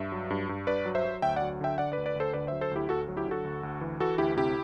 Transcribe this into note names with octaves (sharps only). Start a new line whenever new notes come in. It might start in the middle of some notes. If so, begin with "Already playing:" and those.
Already playing: G2 E5
F#3
G2
G2
G2 B4 D5
F#3
C5 E5
F#3
D2 E5 G5
D5 F#5
F#3
D3 E5 G5
D3 D5 F#5
B4 D5
D2
B4 D5
D2 A4 C5
D3 B4 D5
F#3 C5 E5
A4 C5
D2 E4 G4
D2 F#4 A4
F#3
E4 G4
D3 F#4 A4
D2
D2
E3
E3 F#4 A4
D2 E4 G4
C3 E4 G4